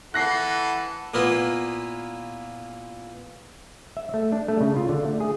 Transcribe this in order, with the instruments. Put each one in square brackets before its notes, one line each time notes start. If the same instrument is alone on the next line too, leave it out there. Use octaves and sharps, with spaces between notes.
[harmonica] E3 A4 F#5 [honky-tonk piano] F#6 A#6 C7
[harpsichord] A#2 A#3 B3 E4 F4
[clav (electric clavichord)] E5
A3
D4
A3
C#3
F4
D3
A3
G#4